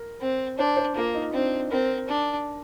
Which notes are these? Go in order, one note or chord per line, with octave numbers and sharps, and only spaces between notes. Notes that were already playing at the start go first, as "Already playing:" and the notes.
Already playing: A#4
C4
D4 C5
C5
A#3 F4
D#4
C4 D4
C4 A#4
D4